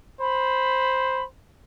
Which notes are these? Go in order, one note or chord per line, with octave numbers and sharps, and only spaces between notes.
C5 B5